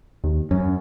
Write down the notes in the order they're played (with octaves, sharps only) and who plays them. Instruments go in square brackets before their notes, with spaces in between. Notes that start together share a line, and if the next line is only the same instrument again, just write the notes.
[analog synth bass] D#2
[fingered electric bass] F#2 [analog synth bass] C#4